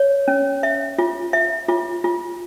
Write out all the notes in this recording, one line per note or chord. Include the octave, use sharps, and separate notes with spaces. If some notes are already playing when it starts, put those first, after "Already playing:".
Already playing: C#5
C#4
E5
F4
E5
F4
F4